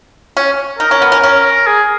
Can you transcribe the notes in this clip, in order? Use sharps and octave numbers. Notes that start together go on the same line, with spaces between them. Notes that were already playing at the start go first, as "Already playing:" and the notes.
C#4
D#4 A#4
C#4
B3
C#4
C#4
G#4